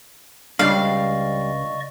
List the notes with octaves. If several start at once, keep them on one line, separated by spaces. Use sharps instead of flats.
C#2 G3 D4 D5 D#5 F5 C#6